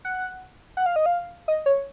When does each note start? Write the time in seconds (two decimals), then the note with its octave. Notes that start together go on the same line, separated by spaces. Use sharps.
0.05 F#5
0.77 F#5
0.86 F5
0.96 D#5
1.06 F5
1.48 D#5
1.66 C#5